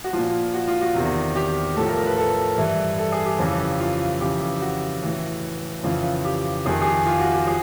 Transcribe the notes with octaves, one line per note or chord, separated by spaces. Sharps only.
F#4
A#2 F3 F4
F#4
F4
F#4
E2 C3 D#3 F#4
G4
A2 F3 A4
A#4
A#4
B4
A4
G2 E3 E4
A4
G#4
G4
F2 C#3 E3
F4
F2 C#3 E3 G4
F#4
A2 E3
F2 C#3 E3 F4
G4
F2 C3 D#3 G#4
G#4
G4
F4
F#4
G4
F3 G#4